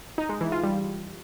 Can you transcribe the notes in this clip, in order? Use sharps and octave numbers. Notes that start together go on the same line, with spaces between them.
D#4
G#3
E3
F4
G3